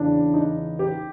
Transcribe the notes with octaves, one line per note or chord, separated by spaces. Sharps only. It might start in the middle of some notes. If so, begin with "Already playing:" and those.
Already playing: E2 C#3 E3 D4
D#4
G4